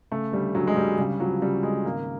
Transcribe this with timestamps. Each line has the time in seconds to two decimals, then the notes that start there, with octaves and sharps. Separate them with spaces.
0.11 C#3 A3
0.32 D2 G3
0.55 D2 F#3
0.67 G#3
0.76 D2 G3
0.98 C#3 G3
1.20 F3 F#3
1.42 C#3 G3
1.63 C#3 G#3
1.85 G#1 A#3